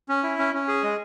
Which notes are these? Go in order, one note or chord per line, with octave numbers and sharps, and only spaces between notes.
C#4
E4
C#4
C#4
G#4
G#3